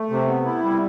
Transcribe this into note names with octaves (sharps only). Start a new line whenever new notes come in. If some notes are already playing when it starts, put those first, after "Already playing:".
Already playing: A3
C3
B3
E4
G3